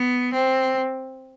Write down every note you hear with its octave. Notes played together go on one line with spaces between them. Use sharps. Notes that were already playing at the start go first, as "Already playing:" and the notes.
Already playing: B3
C4